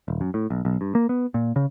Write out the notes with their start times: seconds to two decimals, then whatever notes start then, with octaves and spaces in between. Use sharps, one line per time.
0.08 D#1
0.21 F#2
0.34 A2
0.50 B1
0.65 B1
0.81 G2
0.95 A#3
1.09 B3
1.34 A#2
1.56 C#3